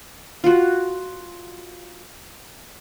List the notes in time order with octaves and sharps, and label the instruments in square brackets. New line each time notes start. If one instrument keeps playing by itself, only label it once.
[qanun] F4 F#4